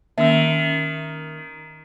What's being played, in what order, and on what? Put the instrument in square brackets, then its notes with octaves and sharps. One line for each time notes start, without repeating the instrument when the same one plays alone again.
[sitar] D#3 [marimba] A#3 C#4 [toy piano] E5 E6